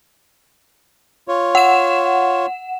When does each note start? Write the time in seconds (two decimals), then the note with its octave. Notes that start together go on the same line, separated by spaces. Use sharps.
1.28 F4 C#5
1.55 F#5 E7